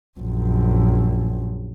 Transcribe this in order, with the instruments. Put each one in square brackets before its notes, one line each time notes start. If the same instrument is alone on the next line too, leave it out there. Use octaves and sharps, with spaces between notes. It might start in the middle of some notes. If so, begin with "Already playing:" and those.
[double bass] A#1 F#2